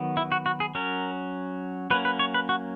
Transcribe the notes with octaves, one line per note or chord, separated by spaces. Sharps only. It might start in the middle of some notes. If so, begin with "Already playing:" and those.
Already playing: D#3 F#3 B3
E4
F#4
F#4
G#4
F#3 C#4 A#4
F#3 A#3 C#4 B4
B4
C#5
B4
F#4